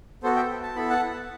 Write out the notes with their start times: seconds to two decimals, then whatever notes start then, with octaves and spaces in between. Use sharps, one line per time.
0.23 B3 F#4 A4 C5
0.35 E5 G5
0.63 A5
0.76 B3 E4 A4 B5
0.90 F#5 A5